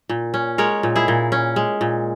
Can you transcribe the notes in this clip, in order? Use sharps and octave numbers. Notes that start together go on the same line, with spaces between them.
A#2
C#4
G#3 A#4 C#5
A#2
E4 G#4
A#2
C#4
G#3
A#2